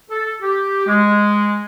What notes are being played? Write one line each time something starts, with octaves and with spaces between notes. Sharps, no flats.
A4
G4
G#3